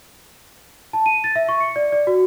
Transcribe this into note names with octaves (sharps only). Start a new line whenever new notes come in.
A5
D#7
A6
E5
C#6
C#7
D5
D5
F#4